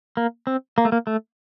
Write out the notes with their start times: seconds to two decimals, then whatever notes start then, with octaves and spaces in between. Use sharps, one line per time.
0.17 A#3
0.47 C4
0.78 A#3
0.85 A3
0.92 A#3
1.07 A3